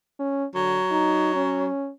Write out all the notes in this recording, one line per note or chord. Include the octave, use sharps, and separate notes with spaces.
C#4
D3 F#3
D#4
C#4